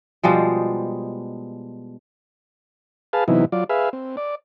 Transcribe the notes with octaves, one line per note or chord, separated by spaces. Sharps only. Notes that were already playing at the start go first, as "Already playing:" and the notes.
B2 F3 G3 G#3
G#4 B4 F5 A5
C3 E3 F#3 B3 D#4 E4
F#3 F4 D5
G#4 B4 E5 F5
C4
D5